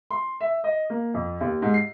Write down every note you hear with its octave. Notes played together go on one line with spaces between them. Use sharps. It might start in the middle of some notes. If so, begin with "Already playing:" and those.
C6
E5
D#5
A#3
F2
D#2
G#2
C7